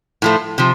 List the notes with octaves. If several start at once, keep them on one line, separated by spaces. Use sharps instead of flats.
A2 F3 A3
C3 F3